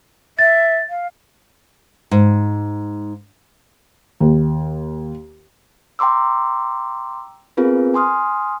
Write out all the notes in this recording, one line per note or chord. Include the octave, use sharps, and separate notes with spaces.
E5 A6
F5
G#2
D#2
G5 A#5 C6 D6 E6
B3 C4 F4 G#4 A#4 B4
G#5 C6 D#6 F6